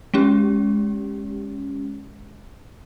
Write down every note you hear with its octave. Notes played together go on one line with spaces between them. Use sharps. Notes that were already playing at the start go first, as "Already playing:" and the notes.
G#3 C#4 G4